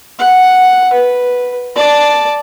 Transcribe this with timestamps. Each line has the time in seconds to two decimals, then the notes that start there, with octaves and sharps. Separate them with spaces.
0.20 F#5
0.93 B4
1.76 D5 A5